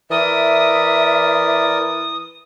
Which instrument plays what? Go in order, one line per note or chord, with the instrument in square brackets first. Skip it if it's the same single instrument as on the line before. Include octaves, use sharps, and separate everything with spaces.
[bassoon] E3 [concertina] A#4 D5 [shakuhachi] E5 [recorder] D#6